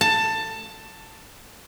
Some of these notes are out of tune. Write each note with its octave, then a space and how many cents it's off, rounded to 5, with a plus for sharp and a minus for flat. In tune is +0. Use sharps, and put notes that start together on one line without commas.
A5 +15